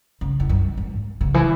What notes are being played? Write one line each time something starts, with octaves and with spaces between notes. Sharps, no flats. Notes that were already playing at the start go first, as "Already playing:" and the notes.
C#3
E2
F#2
G#2
C#3
E3